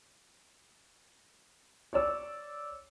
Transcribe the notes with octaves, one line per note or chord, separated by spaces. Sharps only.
C#5 D5 E6